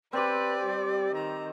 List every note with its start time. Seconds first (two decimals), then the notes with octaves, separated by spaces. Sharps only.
0.13 C4 G4 B4 D5
0.65 G3
1.14 D#3 A#5